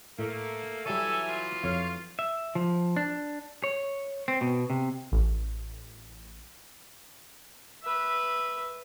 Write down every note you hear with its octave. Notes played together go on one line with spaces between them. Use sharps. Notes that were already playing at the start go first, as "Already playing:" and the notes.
A2 A3 A#3
E3 F#3 G3 A4 C#5 E5 G#5
F4
F2 C#5 F5
E5
F3
D4
C#5
C4
B2
C3
A1
B4 E5